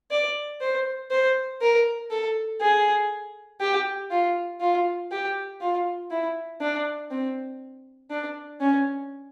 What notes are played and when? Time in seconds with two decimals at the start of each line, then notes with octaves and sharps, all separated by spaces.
0.11 D5
0.61 C5
1.11 C5
1.61 A#4
2.10 A4
2.61 G#4
3.61 G4
4.11 F4
4.60 F4
5.11 G4
5.61 F4
6.10 E4
6.61 D4
7.11 C4
8.10 D4
8.60 C#4